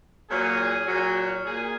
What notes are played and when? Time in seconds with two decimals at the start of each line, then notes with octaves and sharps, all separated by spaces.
0.29 A#2 F#3 G#4
0.86 A#2 F#3
1.44 A#2 G#4